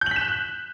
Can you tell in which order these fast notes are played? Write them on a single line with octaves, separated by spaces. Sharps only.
G6 F#7 B6 E7 F#6